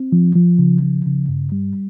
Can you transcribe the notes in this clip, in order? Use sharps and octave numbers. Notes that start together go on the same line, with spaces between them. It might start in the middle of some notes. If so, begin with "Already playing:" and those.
Already playing: C4
F3
F3
C#3
F3
C#3
G2
G3